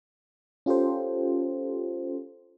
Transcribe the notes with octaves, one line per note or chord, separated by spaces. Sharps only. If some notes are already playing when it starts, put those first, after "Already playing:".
C#4 F4 G4 A4 C5